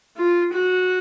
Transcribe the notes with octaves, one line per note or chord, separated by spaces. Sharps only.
F4
F#4